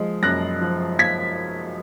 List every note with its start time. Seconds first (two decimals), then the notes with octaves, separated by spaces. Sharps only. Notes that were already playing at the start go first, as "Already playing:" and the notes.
Already playing: F3 G#3
0.23 F#2 F#6 A#6
0.61 F3
0.98 F3 G#6 B6